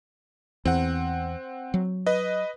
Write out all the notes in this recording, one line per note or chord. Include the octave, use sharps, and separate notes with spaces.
E2 C4 F#5
F#3
B4 D#5